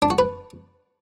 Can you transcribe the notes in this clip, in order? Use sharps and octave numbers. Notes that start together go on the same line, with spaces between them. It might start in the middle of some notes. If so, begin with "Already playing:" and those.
D4
F#4
B4